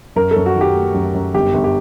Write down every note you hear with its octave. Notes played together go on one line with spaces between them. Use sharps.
F#2 A#4
A4
F#2
F#4
D#3
G4
A3
F#2
F#2
G1 G4
G1
G4